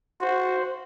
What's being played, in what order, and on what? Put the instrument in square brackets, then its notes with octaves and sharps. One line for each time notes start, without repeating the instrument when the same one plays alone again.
[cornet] F#4 [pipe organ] C5